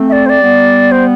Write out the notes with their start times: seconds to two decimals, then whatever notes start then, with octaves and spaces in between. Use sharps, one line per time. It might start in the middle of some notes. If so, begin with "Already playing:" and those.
Already playing: A3 C4
0.09 E5
0.12 D5
0.26 C5
0.29 D5
0.41 G3 B3
0.92 C5